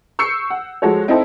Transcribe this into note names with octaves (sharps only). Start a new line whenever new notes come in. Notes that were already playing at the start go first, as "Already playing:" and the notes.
C#6 E6 G6 C7 C#7
F#5
F3 G#3 F#4 A4 C#5
C4 D#4 E4 A4